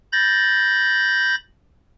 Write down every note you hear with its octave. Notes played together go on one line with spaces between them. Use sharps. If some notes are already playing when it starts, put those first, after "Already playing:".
B5 G6 A6 A#6